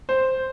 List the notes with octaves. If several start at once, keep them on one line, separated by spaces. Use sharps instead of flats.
C5